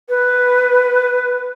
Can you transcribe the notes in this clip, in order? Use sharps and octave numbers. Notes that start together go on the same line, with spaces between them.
B4